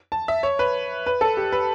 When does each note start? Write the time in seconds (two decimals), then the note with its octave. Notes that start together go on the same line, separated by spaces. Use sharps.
0.12 A5
0.28 E5
0.43 C#5
0.59 B4
1.06 B4
1.21 A4
1.37 G4
1.52 B4